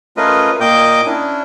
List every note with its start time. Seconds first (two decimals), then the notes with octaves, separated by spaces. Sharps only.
0.17 A3 C#4 F4 A#4 B4 D#5
0.60 A#2 A#3 D#5 G5 D6 G6
1.06 C#4 D4 E4